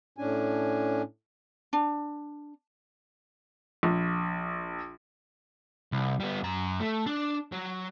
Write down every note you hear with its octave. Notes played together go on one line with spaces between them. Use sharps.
A2 C#4 D4 G#5
D4
A#1
C2
G3 B3
F#2 A#5
A3
D4
F#3